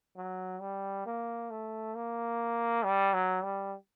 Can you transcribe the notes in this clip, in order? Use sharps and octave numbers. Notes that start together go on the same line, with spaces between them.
F#3
G3
A#3
A3
A#3
G3
F#3
G3